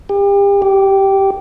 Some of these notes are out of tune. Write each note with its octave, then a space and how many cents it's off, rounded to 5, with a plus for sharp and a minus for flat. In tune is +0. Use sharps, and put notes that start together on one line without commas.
G4 +35
G4 -10